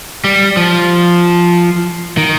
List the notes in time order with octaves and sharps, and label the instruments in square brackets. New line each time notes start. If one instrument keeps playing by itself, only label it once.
[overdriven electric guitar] G3
F3
D#3